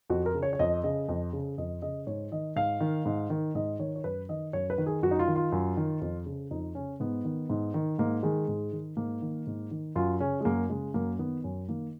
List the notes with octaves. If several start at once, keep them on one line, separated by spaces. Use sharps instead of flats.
F2 F#4
A#4
C#3
C#5
C#5
F2 D#5
C#3 D#5
F2
C#3
F2 D#5
C#3 D#5
G#2 C#5
D#3 D#5
G#2 F5
D#3
G#2
D#3
G#2 D#5
D#3 C#5
C#5
F#2 B4
D#3 D#5
F#2 C#5
B4
D#3
G#4
F#2 F#4
D#4
F4
D#3
F4
F#2
D#3
F2
C#3
F2 D#4
C#3 C#4
G#2 B3
D#3
G#2
D#3
G#2 A#3
D#3 G#3
G#2
D#3
G#2 A#3
D#3
G#2
D#3
F#2 F4
C#3 C#4
G#3
F#2 A#3
C#3 G#3
F#2 A#3
D#3 B3
F#2 C#4
D#3 A#3